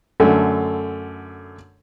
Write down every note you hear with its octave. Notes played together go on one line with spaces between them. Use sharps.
F#2 D3 A3